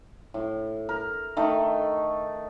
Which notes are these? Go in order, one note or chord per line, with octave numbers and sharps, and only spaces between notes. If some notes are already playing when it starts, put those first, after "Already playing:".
A2
A#4
D#3 A3 D#4